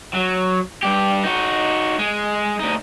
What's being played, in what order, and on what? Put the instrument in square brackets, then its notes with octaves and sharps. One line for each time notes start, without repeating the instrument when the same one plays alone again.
[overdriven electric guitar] F#3
G2 G4
D#4 F#4
G#3
D2 D#4